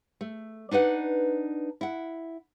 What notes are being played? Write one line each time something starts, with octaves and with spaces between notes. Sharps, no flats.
A3
D4 D#4 B4 F#5
E4 F#5